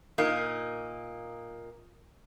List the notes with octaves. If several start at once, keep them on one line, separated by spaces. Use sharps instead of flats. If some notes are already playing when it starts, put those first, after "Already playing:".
A#2 A#3 D#4